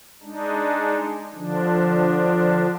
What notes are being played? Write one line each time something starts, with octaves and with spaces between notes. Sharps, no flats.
G#3 D4 D#4
D3 F3 D4